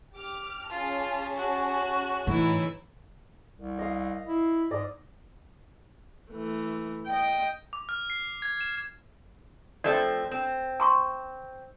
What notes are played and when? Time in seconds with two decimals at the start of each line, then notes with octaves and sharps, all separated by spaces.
0.14 G4 D6 F6
0.70 C#4 F4 G#4 A5
1.37 F#4
2.27 A2 E3 D#4 E4 C#5
3.57 C2
3.79 D#5 F5
4.27 E4
4.71 G#2 D5 D#5
6.30 E3 A3
7.07 D#5 G5
7.73 D6
7.89 F6
8.10 C7
8.42 G#6
8.61 E7
9.84 F3 A3 C4 D5
10.31 C4
10.80 A#5 C6 C#6